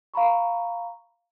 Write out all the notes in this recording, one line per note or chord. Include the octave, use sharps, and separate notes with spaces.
F5 A#5 B5 C#6